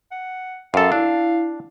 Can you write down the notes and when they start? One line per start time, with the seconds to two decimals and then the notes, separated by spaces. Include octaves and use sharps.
0.12 F#5
0.74 F#2 A4 F5
0.92 D4 E4